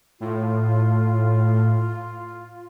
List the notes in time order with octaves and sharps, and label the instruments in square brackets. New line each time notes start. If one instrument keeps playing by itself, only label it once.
[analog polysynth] A2 [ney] F4